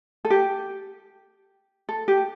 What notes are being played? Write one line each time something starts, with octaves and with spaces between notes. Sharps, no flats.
A4
G4
A4
G4